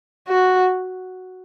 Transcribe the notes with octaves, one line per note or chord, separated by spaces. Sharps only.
F#4